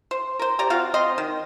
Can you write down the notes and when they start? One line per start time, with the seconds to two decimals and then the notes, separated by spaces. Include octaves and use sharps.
0.11 C5
0.39 A#4 C5
0.59 G4 D5 G5 A#5
0.70 C4 F4 F#4 F5
0.94 C4 D#5 C6
1.18 D#3